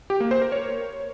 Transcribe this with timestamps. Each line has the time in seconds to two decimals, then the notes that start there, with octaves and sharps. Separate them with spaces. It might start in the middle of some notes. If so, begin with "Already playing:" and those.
0.10 G4
0.20 A#3
0.31 C5
0.42 A#4
0.52 C#5